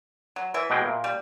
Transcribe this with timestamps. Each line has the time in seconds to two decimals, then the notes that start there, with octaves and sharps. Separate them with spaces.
0.36 F#3
0.54 E3 E4 E5
0.70 B2 G#3 G5
0.84 A#2
1.04 G3